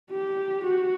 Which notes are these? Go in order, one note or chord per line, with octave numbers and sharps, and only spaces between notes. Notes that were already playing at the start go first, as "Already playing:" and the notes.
G4
F#4